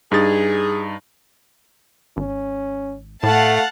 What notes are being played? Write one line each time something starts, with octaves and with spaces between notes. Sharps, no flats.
G2 D#4 G#4 A6
G#1 C#4
A2 A3 F5 F#5 A5